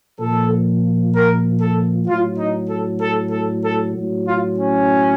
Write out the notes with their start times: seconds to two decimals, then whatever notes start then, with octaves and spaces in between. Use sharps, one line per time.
0.19 A#2 F3 A4
1.13 A#4
1.60 A4
2.06 A2 F#3 F4
2.38 D#4
2.69 A4
3.01 A4
3.31 A4
3.63 A4
3.94 A2 F#3
4.25 F4
4.57 C#4